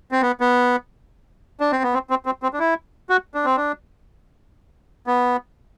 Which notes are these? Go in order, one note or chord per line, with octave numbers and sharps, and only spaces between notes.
C4
B3
B3
D4
C4
B3
C4
C4
C4
C4
D4
E4
F#4
D4
C4
D4
B3